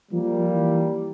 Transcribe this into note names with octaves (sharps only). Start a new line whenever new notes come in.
F3 G3 A#3
E3